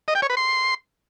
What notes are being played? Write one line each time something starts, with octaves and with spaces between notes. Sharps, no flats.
D#5
G5
C#5
B4
C6